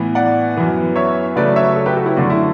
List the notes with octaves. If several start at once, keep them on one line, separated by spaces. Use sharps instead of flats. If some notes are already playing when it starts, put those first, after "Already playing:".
Already playing: A2 E3 B3
D5 F#5
F#2 E3 B3
C#5 E5
C#3 F#3 A3 B4 D5
C#5 E5
A4 C#5
G4 B4
F#4 A4
E4 G4
F#2 D3 A3 D4 F#4
E4